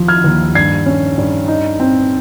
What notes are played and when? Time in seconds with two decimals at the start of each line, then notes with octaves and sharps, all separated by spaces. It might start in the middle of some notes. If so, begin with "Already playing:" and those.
Already playing: D#2 F3
0.08 F6 G#6
0.24 D#2
0.55 G2 G#6 C7
0.86 C#4
1.18 G2
1.48 D#4
1.80 C4